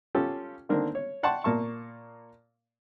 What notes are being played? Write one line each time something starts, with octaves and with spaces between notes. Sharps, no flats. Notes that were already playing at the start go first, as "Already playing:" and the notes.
C#4 F4 G4 A4
D3 D#3 A#3 C4 D4
C#5
D5 F#5 G5 A5 C6 C#6
A#2 A#3 A5 C#6